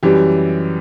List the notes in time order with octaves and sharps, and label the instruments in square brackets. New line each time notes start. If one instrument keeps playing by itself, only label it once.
[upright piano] F#2 E3 G3 G4